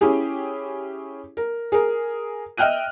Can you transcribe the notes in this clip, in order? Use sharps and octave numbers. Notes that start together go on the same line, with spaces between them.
C#4 E4 G4 G#4
A#4
G#4 A#4
D#5 E5 G5 F6 F#6 D#7